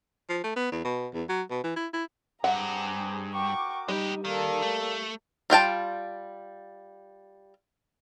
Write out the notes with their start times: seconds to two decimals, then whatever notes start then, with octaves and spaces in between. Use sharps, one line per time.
0.29 F3
0.44 A3
0.56 B3
0.72 E2
0.85 B2
1.14 E2
1.29 F#3
1.51 B2
1.64 E3
1.76 E4
1.93 E4
2.44 G2 C4 G4 G#4 F#5 A#5
3.34 F#4 A#4 G5 C#6 D6
3.88 G3 G#3 D#4 G4
4.25 D#3 A#3 A4 D5
4.62 A3
5.50 G3 F4 G5 A5